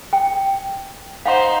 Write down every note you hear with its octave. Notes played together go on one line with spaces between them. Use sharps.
G5
D#4 C5 F5 F#5 C6